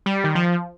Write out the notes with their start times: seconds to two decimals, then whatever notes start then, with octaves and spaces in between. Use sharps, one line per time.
0.06 G3
0.24 D#3
0.35 F3